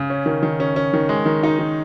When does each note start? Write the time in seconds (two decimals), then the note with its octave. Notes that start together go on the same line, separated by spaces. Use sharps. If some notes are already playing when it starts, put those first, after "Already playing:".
Already playing: C#3
0.10 C#4
0.26 D#3
0.43 D#3
0.60 C#4
0.76 C#4
0.93 D#3
1.09 G#3
1.26 D#3
1.43 D#4
1.59 D#3